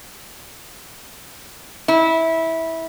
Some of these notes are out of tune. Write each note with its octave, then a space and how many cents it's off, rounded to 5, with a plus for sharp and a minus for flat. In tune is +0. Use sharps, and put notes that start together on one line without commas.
E4 -15